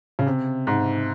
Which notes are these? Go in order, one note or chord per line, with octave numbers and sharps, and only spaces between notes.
C#3
C3
G#2